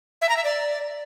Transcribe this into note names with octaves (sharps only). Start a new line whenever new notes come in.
E5
A#5
E5
D5